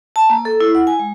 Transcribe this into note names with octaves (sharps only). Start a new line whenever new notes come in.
A5
A#3
A4
E4
F#5
G#5
G#3